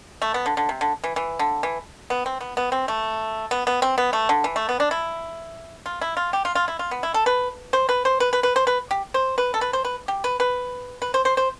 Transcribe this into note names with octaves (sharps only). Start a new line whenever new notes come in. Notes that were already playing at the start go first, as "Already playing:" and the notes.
A3
B3
D3
D3
C3
D3
E3
E3
D3
E3
B3
C4
B3
B3
C4
A3
B3
B3
C4
B3
A3
D3
E3
A3
B3
D4
E4
F4
E4
F4
G4
F4
F4
E4
F4
B3
E4
A4
B4
C5
B4
C5
B4
B4
B4
C5
B4
G4
C5
B4
A4
B4
C5
B4
G4
B4
B4
B4
C5
C5
C5